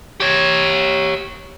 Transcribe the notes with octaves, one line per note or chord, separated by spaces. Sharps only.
G4 C#5